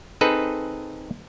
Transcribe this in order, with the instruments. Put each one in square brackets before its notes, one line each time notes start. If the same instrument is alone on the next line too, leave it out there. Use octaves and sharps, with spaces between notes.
[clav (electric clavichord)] C4 D#4 G#4 A4 B4